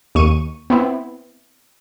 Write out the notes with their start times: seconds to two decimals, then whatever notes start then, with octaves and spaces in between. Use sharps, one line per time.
0.15 D#2 C#6 D#7
0.70 B3 C4 E4